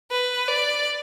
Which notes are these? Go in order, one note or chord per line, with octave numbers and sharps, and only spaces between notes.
B4
D5